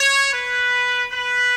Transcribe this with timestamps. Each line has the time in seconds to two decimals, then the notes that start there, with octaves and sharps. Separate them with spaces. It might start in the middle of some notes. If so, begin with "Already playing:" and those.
Already playing: C#5
0.33 B4
1.11 B4